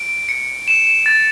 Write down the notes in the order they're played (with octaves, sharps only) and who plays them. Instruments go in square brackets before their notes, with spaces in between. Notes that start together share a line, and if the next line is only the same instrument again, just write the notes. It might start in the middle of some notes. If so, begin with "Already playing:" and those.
Already playing: [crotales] D7
C#7
E7
E7
A6